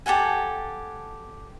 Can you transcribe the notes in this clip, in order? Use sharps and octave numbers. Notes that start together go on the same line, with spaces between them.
G4 A4 F#5 G#5